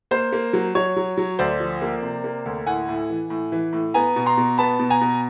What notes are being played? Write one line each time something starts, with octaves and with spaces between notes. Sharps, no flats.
A#3 C5
A#3
F#3
F#3 C#5
F#3
F#3
D2 C5 D5
F3
A#3
C3
A#3
D2
A2 F#5 G#5
A2
E3
A2
E3
A2
B3 G#5 A#5
B2
A#5 C6
B2
B3 A5 B5
B2
G#5 A#5
B2